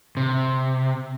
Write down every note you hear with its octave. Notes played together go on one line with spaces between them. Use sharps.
C3